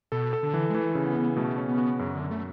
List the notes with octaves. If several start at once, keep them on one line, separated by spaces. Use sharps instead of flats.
B2 A4
A4
D3
E3
G#3
E3 A3
C#3 A3
B3
C#3
B2 A3
C#4
B3
F#4
F#2 C#3
D3
F#2
A3